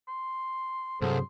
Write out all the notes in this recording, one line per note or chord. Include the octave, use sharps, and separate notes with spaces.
C6
C2 G2 C3 F#3 G#4 A4 C5 C6